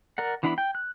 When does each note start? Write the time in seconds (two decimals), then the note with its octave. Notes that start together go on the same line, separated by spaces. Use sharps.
0.18 A#4 D5 F#5
0.43 E3 B3 D4 E4 B5
0.58 G5
0.75 F#6